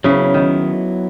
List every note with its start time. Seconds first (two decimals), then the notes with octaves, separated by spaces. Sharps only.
0.04 C#3 F#3 B3 E4
0.34 D#3